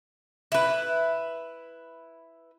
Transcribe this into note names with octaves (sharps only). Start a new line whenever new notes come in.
E4 B4